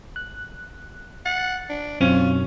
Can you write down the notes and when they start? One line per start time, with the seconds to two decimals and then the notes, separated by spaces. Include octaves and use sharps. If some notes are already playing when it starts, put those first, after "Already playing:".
0.16 F#6
1.26 F#5 A6
1.69 D4
2.01 B1 F#2 C4 C#4 F4